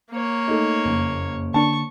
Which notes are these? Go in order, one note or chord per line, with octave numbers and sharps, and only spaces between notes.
A#3 C#5
A3 D#4
F#1 F2
D3 A#3 D4 A5 C#6